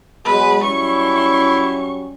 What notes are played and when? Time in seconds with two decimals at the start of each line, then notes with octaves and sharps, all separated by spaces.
0.25 B2 F#3 G#3 B4
0.63 F#3 G3 C#4 E4 C#6